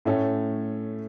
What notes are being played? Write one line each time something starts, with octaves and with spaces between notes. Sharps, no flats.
A2 A3 C#4 A4